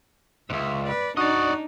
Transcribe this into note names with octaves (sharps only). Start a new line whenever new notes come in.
C#2 G#2 E5
B4 D5
D4 D#4 F#4 D5 D#5